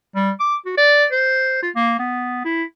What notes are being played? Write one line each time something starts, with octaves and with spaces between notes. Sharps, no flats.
G3
D6
F#4
D5
C5
F4
A#3
B3
E4